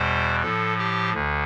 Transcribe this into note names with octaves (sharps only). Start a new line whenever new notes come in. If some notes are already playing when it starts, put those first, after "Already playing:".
Already playing: E2 B2 G3 C5
A2 F3 A4
G4
D2 D3